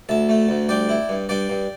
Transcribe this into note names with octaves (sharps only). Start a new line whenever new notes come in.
D2 E5 A5
A3
D2
G2 D5 G5
E4
G2
G2 D5 G5
G2